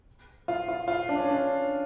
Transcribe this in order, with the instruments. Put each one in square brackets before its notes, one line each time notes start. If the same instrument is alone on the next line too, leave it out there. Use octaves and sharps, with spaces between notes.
[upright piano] F4
F4
F4
D4
C#4
D4